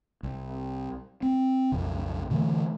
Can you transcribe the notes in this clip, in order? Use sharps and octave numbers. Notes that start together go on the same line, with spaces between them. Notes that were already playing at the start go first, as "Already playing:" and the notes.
C2
C4
B1 F2 C#3
B2 D3 E3 A3